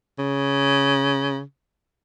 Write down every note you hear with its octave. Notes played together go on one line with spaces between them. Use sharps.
C#3